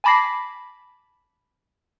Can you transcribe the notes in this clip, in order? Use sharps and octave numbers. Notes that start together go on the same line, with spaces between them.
G#5 A5 B5 D6 A#6 C7